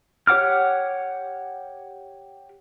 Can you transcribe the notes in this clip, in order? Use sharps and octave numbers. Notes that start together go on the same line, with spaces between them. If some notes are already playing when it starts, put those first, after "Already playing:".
G4 C#5 F#5 D6 F6